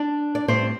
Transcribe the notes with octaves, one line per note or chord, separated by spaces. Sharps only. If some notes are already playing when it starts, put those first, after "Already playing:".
Already playing: D4 D5
D5
A2 G3 C4 C5